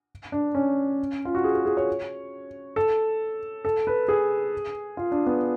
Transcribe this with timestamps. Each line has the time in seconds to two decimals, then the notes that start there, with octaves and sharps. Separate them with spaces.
0.32 D4
0.55 C#4
1.25 F4
1.35 F#4
1.44 G#4
1.54 G#4
1.65 G#4
1.77 C#5
2.76 A4
3.65 A4
3.87 B4
4.08 G#4
4.97 F4
5.12 D4
5.26 B3